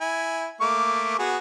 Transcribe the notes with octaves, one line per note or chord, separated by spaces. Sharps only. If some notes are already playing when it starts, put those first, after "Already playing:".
E4 G#5
A3 A#3 D6
B3 F#4 G#4